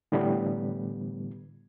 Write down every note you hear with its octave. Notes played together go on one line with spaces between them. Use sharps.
A2 D3 E3 G3 B3